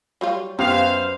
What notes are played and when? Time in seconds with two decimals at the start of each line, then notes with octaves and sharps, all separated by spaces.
0.21 F#3 G3 F4
0.59 F#2 B3 G4 C5 F5